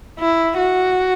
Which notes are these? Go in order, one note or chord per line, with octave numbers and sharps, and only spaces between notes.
E4
F#4